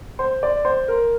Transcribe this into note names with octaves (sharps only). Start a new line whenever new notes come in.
C5
D5
C5
A#4